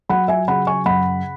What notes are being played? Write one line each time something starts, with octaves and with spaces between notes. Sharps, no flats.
F#3 F#5 B5
E5 G#5
C#3 F#5 B5
G#5 C#6
F#2 F#5 B5